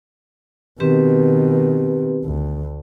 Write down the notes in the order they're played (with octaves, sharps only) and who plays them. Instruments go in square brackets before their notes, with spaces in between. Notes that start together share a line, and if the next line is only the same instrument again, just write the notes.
[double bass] B2 D#3 [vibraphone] C4 G4 B4
[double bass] D2